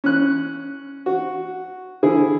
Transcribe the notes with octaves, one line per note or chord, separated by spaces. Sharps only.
C#4 F#6
F#4
D3 E4 G#4